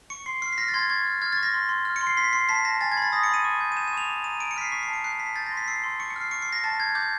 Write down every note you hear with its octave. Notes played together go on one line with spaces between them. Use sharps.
C#6 C#7
C6 C7
F6 C7
B6
F6 A#6
A6
C6 G#6
A6
C#6 G#6
F6
F6 G#6
C#6 A6
A#6
C6
C6
F6
C#7
C6
C7
C6 B6
C6 C7
A5 B6
A5 A#6
G#5 A6
G#6
B5 A6
D#6 A#6
C#7
B5 D#7
C#6
G6
D#7
G6 E7
E7
C#6 F7
D6
A#5 D#7
A#5 D7
C#7
F6 B6
C7
C#6 B6
C7
A5
C#7
F#6 C7
A5 B6
G6 A6
A#6
C6
B6
E6 C7
C6
C#6 C#7
C#7
F6
C7
C#6 C#7
C7
C#6 A#6
A5 A6
G6 G#6
D6 G6